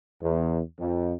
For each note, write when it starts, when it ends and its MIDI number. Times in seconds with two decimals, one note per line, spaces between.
0.22 0.60 40
0.80 1.15 41